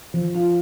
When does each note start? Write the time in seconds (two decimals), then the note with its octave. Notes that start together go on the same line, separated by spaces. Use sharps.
0.14 F3
0.35 F4